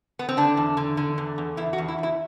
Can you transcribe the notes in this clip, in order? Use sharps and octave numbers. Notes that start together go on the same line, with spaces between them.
B3
C4
D3 D4
E2
D3
D3
E2
E2
E2 E4
F#4
E2
E4
E2 E4